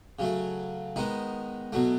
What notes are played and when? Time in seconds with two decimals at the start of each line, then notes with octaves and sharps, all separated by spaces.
0.19 C#3 F#3 A3
0.96 D#3 G#3 B3 D#4
1.73 B2 F#3 A3